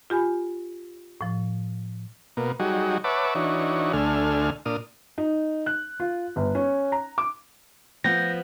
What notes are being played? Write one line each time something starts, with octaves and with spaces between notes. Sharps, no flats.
F4 G4 G#5 B5
A2 F3
B2 A#3
F#3 G3 D#4 F#4 G#4
B4 C#5 E5 F#5 A5 D6
E3 D4 D#4 F#4 C#5
D2 D3 A3 G#5 F6
A#2 D4 D#6 F6
D#4
F#6
F4
G1
C#4
A#5
D6
F3 B3 G6 A#6